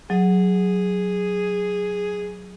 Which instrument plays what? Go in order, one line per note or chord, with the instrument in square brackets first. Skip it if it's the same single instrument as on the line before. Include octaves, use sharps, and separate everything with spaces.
[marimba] F#3 [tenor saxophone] G#4